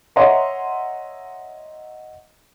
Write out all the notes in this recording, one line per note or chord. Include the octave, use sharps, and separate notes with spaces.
C#5 D#5 E5 F#5 A#5 C6